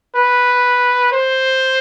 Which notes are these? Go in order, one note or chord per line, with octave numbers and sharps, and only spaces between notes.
B4
C5